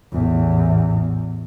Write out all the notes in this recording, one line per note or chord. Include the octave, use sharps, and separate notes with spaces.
A1 E2